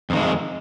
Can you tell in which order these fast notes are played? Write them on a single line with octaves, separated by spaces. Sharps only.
F2 D#3 G#3